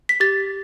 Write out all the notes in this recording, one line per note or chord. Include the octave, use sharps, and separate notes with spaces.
B6
G4 A6